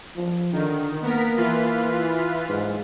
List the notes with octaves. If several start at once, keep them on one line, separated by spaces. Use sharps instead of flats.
F3
D3 D#3
A#3 B3 A#4 B6
E3 F4 B4
G#2